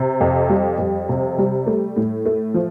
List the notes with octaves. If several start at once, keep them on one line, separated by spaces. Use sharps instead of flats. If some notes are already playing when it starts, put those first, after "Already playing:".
Already playing: C3
F2
G3
F2
C3
G3
A3
A2
A3
F3